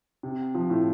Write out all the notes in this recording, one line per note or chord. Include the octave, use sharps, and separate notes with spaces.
C3
F3
A2